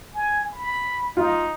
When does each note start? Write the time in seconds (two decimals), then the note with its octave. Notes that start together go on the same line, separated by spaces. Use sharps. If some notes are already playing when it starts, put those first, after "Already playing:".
0.14 G#5
0.53 B5
1.17 D#4 F4